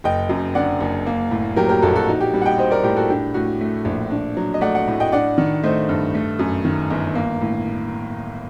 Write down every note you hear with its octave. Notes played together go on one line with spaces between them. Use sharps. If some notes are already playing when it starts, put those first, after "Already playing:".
F#1 D#5 G5
F#2
D3 D5 F#5
F#1
A#3
A2
F#3 G4 A#4
G4 A#4
A#1 F#4 A4
F#4 A4
D#4 F#4
G4
G3
F#5
D#5 G5
C4 C5 D#5
A#4 D5
A2 G4
F#4 A4
D4 G4
A2 F#4
A3
A#1
D4
F#3
D#5
A3 D5 F#5
D5 F#5
A2
D#5 G5
D4 D5 F#5
D#3
A3 C5 D#5
G2
A3
F#2
D#3
G1
A#3
A2